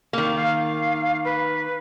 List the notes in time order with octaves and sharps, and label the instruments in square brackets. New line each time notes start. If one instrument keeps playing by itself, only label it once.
[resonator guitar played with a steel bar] D#3 A#3
[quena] F5
B4